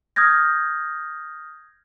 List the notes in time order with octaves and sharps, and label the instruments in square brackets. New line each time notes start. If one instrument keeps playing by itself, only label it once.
[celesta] D#6 F6 G6 G#6 A#6